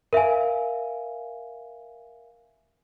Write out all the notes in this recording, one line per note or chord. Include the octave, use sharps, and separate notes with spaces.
A#4 E5 F5 G#5